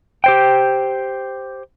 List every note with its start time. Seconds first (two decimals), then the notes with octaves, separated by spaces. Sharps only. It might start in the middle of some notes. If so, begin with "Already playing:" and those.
0.24 G4 C5 G5